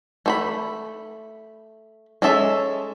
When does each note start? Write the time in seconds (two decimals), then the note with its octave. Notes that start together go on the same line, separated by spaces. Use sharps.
0.26 A3 C5 B5
2.22 G#3 C#4 A4 E5